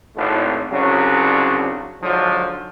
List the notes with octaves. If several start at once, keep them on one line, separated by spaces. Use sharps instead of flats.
G#1 A2
C2 C#3 F#3 D4 F#4
G#2 D3 F3 F#3